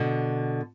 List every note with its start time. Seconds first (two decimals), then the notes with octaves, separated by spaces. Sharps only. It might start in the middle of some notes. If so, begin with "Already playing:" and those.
Already playing: B2 D3